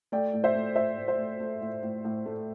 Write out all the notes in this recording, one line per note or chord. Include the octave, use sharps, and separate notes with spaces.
A3 D5 G5
A2
C5 E5
A3
A3 C5 E5
A2
C5
A3
A3
A2
A2
A2
A3